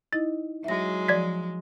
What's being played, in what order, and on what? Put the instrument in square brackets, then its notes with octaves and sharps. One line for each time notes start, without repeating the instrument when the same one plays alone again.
[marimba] D#4 E4 D#5 [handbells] A6
[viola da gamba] F#3 G#3 [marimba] E5 A#6
[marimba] F3 [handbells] D5 G#6 B6